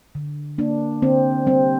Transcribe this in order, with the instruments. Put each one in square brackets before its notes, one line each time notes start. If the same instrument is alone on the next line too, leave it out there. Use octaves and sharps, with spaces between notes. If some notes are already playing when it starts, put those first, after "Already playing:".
[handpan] D3
A#3 D4
D3 C4
G3 C4